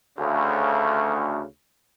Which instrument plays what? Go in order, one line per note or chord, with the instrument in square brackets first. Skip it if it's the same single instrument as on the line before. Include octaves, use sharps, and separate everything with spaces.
[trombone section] D2 C#3